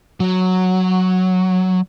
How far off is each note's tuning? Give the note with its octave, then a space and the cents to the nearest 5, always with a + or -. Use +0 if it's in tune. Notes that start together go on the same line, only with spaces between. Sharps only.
F#3 -5